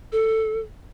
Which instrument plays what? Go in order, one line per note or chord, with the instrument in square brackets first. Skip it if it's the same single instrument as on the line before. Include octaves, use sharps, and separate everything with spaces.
[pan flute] A4